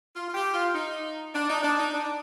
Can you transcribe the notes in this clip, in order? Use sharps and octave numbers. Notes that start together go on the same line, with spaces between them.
F4
F4
G4
F4
D#4
D4
D#4
D4
D#4
D4